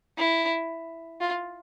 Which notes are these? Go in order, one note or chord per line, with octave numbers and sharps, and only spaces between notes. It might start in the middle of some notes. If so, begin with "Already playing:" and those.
E4
F4